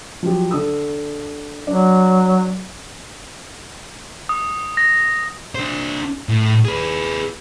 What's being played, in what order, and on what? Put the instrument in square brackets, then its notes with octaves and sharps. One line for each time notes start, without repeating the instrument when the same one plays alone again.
[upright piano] F3 F#3 G4
D3 D#6 E6
[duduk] F#3 [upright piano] D4
[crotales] D#6
A#6
[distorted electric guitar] D4 C5
A2
G#4 B4